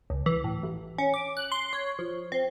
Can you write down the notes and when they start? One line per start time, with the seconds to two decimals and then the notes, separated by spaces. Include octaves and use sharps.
0.10 C#2
0.26 E3
0.44 A2
0.63 A1
0.98 C#4
1.14 D6
1.37 F#6
1.52 C6
1.73 C#5
1.99 F3
2.32 C4